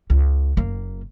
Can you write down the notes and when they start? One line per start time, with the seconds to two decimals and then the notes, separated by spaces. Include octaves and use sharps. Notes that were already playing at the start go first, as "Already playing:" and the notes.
0.10 C#2
0.57 F#1 A#3